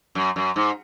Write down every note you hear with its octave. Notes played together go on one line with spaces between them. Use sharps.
F#2
F#2
G#2